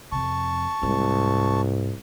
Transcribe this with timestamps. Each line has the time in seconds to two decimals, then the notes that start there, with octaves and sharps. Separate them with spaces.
0.12 F2 C3 A5 C#6
0.83 C2 G#2